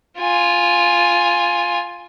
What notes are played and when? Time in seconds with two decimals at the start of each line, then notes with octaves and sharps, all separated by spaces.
0.19 F4 G#5